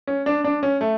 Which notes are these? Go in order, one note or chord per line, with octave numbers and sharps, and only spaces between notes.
C#4
D4
D4
C#4
A3